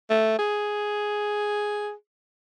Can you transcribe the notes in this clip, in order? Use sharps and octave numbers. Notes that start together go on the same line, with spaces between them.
A3
G#4